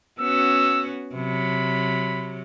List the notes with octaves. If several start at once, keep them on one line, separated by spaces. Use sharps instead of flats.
B3 C#4 F#4 E6
C3 F#3 B5